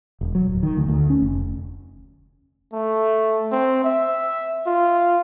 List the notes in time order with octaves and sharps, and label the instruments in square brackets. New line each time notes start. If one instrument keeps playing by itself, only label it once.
[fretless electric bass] E1
F#3
D1
D#3
D2
D2
C#4
F1
[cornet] A3
C4
E5
F4